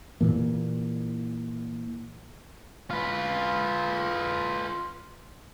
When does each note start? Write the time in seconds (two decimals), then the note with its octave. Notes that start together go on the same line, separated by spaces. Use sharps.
0.21 A#2 E3 A#3
2.91 F4 B4